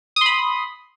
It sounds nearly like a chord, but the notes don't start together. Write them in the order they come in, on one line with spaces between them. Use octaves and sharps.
D#6 C6 B5